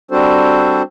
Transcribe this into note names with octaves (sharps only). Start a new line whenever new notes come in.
G3 C4 D4 F#4 A4 C5